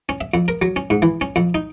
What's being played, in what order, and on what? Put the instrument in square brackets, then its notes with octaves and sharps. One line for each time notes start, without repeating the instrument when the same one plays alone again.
[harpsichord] C#4
E5
F2
A#4
F#3
C#4
G#2
E3
C#4
F2
D#4